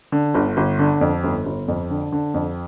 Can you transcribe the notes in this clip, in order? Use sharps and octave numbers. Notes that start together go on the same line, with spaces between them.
D3
G1
G1
D3
F2
G1
G1
F2
D3
D3
F2